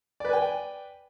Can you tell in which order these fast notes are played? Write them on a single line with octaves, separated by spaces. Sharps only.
D5 B4 G#5 G5